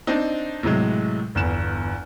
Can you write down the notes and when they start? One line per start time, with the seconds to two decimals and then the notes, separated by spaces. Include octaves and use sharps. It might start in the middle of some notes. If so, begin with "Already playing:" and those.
0.07 C4 D4 D#4
0.63 A2 C3 F#3 G#3
1.35 G1 E2 E7